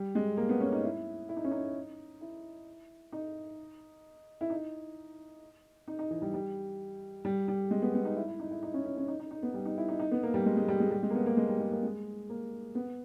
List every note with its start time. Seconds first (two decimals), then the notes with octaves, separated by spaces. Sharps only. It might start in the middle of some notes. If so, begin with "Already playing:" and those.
Already playing: G3
0.15 G#3
0.37 A#3
0.49 B3
0.61 C#4
0.72 D#4
0.84 E4
1.29 E4
1.36 D#4
1.44 C#4
1.51 D#4
2.21 E4
3.12 D#4
4.41 E4
4.50 D#4
5.88 D#4
5.99 D#4
6.11 E3
6.22 G3
6.34 G3
7.25 G3
7.48 G3
7.71 G#3
7.82 B3
7.94 B3
8.05 D#4
8.16 E4
8.28 E4
8.40 D#4
8.51 E4
8.63 D#4
8.74 C#4
8.85 C#4
8.97 C#4
9.08 D#4
9.20 D#4
9.31 D#4
9.43 B3
9.54 G3
9.66 D#4
9.78 E4
9.89 D#4
10.00 D#4
10.11 B3
10.23 A#3
10.34 G3
10.46 G#3
10.57 G#3
10.68 G3
10.80 G#3
10.91 G3
11.03 G#3
11.10 A#3
11.15 B3
11.26 A#3
11.37 G#3
11.49 G3
11.60 G#3
11.72 A#3
11.83 G#3
12.29 A#3
12.75 B3